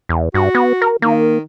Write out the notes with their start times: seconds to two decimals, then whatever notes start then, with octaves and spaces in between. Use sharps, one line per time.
0.09 E2
0.34 G2 F#4
0.55 B3
0.82 A#4
1.02 D#3 A#3